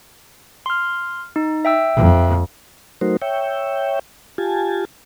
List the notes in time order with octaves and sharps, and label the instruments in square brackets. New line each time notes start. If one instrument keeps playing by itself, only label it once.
[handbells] C6 F6
D#4
E5 G5 E6
[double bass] F2
[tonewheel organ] F#3 A3 D#4 F#4 A#4 C5
C#5 E5 G5
F4 G4 G#5 A5